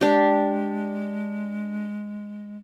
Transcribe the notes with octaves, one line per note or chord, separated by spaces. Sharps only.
G#3 D4 G4